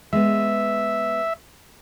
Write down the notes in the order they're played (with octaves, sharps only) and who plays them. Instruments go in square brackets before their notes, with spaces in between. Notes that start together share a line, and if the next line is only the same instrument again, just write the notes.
[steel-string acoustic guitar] G#3 B3 [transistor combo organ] E5